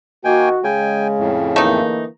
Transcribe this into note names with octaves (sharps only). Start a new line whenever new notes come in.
D#3 A#3 F#4 G5 G#5
C#3 G#3 G5 G#5
F2 A2
D3 E3 A3 A#3 D#4